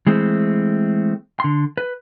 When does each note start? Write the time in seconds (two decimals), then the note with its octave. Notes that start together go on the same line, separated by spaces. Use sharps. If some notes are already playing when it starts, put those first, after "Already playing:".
0.07 E3 G#3 A3 C4
1.40 D3 C6
1.77 B4